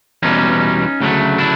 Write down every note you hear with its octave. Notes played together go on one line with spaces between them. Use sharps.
E2 B2 G3 C#4 D#4
D2 C#3 F#3 A3
D4 E4